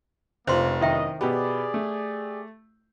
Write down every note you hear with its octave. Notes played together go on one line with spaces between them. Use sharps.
F1 C#3 A3 A#3 F4 C5 C6
F#2 D#3 E4 D#5 E5 G5
B2 B3 G4 G#4 D5
A3